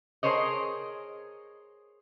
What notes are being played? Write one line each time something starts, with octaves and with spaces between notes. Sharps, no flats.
G#4 A#4 C5 C#5 D#5